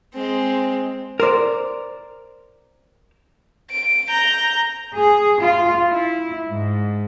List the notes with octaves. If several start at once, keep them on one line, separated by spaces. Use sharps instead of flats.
G#3 C4
A#4 C5 D5
D7
A#5 G6
G#4
F4
E4
G#2